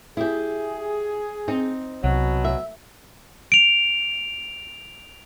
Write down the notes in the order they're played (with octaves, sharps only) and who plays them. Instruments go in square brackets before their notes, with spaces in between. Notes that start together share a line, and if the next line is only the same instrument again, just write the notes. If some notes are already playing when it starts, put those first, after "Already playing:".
[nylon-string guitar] E4 G4 [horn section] G#4
[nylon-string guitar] C4 D#4
[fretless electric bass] C2 [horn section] B2 F#3
[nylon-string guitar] E5
[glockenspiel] D7 F7